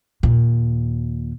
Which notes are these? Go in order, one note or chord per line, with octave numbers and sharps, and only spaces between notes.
D#2 A#2